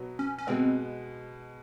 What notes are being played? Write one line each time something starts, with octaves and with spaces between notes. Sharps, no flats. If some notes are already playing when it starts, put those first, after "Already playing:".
Already playing: B2 F#3 B3
C#4
C#4
B2 G#3 B3 C4